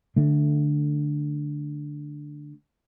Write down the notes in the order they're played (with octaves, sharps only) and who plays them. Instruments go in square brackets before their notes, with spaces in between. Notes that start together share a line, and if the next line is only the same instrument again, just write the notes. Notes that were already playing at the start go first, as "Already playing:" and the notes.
[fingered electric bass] D3 A3